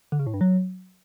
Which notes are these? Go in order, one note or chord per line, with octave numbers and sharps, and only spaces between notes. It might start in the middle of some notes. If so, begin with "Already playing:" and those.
D3
C#3
A2
G2
F#3